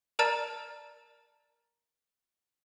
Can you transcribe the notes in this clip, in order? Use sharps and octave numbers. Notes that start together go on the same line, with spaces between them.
A#4 D5 A5 A#5 F6 A6